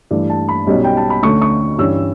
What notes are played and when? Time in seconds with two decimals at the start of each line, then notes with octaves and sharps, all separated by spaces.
0.11 G2 E3 A3 D5
0.30 A5
0.49 B5
0.67 B1 B2 G3 C#4
0.84 G5
0.97 A5
1.10 B5
1.23 D2 D3 A3 C#4 C#6
1.42 C#6
1.78 G2 E3 G3 C#4 E6